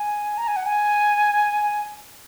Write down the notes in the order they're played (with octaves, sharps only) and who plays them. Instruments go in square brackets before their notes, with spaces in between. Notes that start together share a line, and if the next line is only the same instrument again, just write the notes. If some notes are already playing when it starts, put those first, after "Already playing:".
Already playing: [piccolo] G#5
A#5
G#5
F#5
G#5